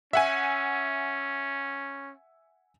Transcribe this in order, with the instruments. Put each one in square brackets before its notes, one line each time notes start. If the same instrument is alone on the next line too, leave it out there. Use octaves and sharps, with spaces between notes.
[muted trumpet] C#4 [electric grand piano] E5 F#5 G#5